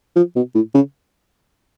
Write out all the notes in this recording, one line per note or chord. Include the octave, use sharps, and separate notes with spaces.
F3
B2
A2
C#3